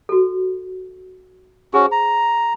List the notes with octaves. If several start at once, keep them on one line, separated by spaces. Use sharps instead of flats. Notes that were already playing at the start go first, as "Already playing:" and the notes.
F#4 A4
C#4 F#4 G#4 C5
A#5